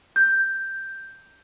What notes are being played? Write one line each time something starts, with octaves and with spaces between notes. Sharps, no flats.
G6